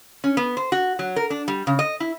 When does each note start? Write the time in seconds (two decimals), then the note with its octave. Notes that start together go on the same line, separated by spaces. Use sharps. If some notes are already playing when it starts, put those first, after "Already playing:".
0.24 C#4
0.37 B3
0.57 C5
0.72 F#4
0.99 F#3
1.16 A#4
1.30 D4
1.48 G3
1.67 C#3
1.79 D#5
2.00 E4